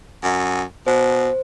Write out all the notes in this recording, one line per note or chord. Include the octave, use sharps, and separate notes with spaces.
F#2
B2 C5